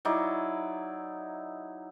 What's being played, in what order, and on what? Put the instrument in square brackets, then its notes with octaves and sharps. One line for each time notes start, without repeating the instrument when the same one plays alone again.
[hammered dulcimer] F#3 D#4 E4 D5